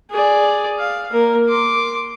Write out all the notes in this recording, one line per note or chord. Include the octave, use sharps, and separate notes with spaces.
G#4 D5
F5
A#3 A#4
C6 D6